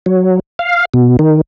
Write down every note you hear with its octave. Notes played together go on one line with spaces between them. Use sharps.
F#3
F5
B2
D#3